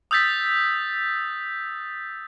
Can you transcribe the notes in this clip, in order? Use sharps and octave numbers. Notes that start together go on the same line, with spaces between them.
D#6 E6 G6 A6 B6